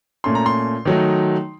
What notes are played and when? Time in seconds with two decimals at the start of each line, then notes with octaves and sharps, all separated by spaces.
0.24 A#2 A3 C#4 C6
0.35 A#5
0.46 C6
0.85 D#3 F#3 A3 D#4